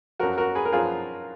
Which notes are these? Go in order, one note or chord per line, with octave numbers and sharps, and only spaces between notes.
F#2 F3 F#4 A#4
F#4 A#4
G#4 B4
A#4
F#2 F3 F4 G#4